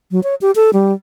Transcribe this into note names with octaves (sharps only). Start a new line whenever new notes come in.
F#3
C#5
G4
A4
G3